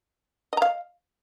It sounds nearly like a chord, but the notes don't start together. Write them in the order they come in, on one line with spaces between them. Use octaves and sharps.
D#5 A#5 F5